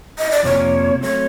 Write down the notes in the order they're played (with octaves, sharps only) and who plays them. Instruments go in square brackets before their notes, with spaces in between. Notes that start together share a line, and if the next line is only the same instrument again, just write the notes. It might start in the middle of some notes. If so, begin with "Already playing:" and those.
[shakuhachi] D#5
D5
[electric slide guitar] F2 C3 F3 A#3 D4 [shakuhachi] C#5
[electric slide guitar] F#3 A3 C4 [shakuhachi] C#5